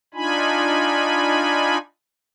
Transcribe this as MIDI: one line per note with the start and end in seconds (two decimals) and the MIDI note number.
0.14 1.78 62
0.14 1.78 63
0.14 1.78 65
0.14 1.78 80
0.14 1.78 83